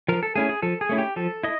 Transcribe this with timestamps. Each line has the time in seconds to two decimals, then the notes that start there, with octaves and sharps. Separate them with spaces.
0.08 F3 A#4
0.23 A4
0.36 A3 C#4 E4 G#4
0.49 G#4
0.62 F3 A4
0.81 G#4
0.89 A3 C#4 E4
0.98 G4
1.16 F3 A4
1.43 E4 D#5